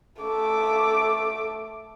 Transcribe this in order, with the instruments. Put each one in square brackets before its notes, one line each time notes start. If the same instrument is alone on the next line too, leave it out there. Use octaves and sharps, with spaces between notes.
[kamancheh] A3 D6